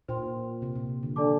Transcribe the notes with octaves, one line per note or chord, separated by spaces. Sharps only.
A#2 C5 G5 C6
C3
A#2
D3
F3 D4 A4 D5 A5 D6